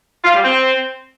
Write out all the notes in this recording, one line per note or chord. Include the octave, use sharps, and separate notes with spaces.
F4
G3
C4